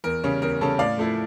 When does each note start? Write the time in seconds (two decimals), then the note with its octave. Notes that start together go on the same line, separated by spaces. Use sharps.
0.04 E2 A#4
0.23 C#3 G3 C#4
0.42 E2 A#4
0.61 C#3 G3 C#4 A4
0.79 A2 D5 F5
0.98 F3 A3 E4